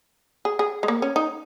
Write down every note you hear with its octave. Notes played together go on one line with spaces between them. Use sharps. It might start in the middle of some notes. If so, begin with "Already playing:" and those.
G#4
G#4
G#3
A#3
C#4
D#4